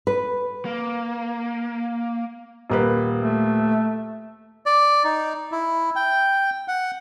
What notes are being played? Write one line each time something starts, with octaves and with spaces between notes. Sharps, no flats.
B4
A#3
D#1 A#3 B4
A3
D5
D#4
E4
G5
F#5